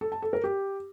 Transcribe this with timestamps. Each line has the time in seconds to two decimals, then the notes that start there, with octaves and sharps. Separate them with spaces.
0.01 A4
0.12 A5
0.22 A4
0.33 A#4
0.44 G4